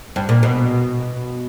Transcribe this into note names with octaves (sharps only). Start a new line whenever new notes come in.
G2
A#2
B2